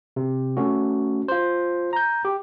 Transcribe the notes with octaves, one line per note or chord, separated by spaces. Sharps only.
C3
A3 C#4 F#4
F4 C5
A#5 G6
G4